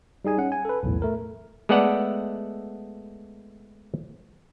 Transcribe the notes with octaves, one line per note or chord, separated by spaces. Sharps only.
G3 D#4 G#4 G#5
C#4 F#5
G#5
A4 B4
B1 E2 A2
A3 A#4
G#3 A3 B3 A4 D5 F#5